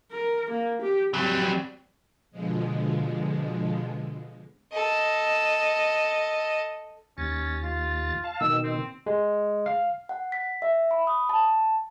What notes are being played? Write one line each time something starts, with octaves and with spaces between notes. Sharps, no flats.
A#4
A#3
G4
F#3 G3 C4
B2 D3 F3 G#3
A4 D#5
D#2 C#4 A6
F4
F5 A5
B2 D#3 E6
C4
G#3
F5
F#5
B6
E5
B5
D#6
A5